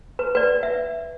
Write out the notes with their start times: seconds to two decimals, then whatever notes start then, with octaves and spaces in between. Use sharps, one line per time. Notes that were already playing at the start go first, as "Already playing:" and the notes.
0.19 B4
0.35 B4 D5
0.63 E5